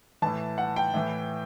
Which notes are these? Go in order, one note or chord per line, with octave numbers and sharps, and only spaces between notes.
A2 E3 A5
F#5
G5
A2 E3